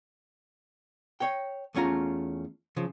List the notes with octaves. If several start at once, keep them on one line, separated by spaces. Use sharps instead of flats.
C#5 G5
E2 A3 C#4 F4 A#5
C#3 F3